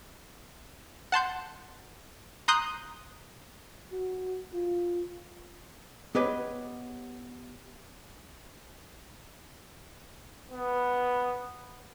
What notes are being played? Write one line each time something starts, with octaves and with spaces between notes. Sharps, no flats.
F#5 A5 C6 G6
A#5 C6 D#6 F#6 G6 C7
F#4
F4
B3 G4 B4 C#5 D#5
B3